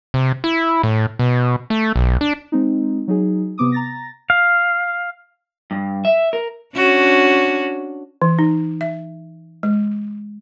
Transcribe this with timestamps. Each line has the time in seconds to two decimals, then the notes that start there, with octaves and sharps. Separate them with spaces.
0.14 C3
0.44 E4
0.83 A2
1.19 B2
1.70 A3
1.96 B1
2.21 D4
2.52 G#3 C4 D#4
3.08 F#3 D#4 G#4
3.58 C3 B3 D6 D#6
3.72 A#5 A6 A#6
4.30 F5
5.71 G2
6.05 E5
6.33 A#4
6.76 C#4 D4 F#4
8.22 E3
8.39 D#4
8.81 E5
9.63 G#3